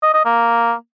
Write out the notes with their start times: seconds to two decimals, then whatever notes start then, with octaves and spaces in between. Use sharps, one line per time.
0.03 D#5
0.14 D#5
0.25 A#3